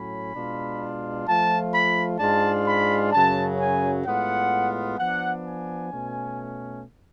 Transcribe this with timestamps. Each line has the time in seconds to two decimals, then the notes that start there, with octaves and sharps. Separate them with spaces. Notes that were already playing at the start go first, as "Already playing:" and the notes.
Already playing: A2 F#3 C#4 B5
0.34 B2 G#3 D4 F4
1.27 F3 A3 F4 A5
1.74 B5
2.19 G#2 G#3 D4 F4 A5
2.66 B5
3.12 F#2 C#3 F#3 A5
3.59 G#5
4.05 A2 G#3 B3 F4 F#5
4.98 F3 B3 D4 F#5
5.45 G#5
5.91 B2 A3 C#4